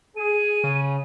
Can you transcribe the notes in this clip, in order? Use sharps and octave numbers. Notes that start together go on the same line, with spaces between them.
G#4 D#7
C#3